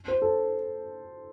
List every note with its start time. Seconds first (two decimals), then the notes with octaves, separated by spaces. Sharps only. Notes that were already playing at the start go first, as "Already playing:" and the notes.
0.08 C5
0.22 A4